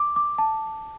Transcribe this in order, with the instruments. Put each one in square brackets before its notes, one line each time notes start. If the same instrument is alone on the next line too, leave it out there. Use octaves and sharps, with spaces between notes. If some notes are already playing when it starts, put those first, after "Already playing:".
Already playing: [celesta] D6
D6
A5